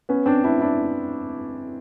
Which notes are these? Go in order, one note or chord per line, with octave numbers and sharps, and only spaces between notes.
B3 C#4
C4 D4
D4 E4
D4 E4